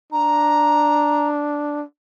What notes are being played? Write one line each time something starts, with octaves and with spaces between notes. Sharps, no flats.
D4 A#5